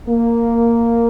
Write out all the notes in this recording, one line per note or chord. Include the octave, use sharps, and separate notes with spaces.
A#3